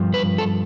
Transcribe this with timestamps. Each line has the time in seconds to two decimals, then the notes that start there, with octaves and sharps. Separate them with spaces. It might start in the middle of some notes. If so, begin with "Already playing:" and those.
Already playing: G2 F3
0.14 B4
0.38 A4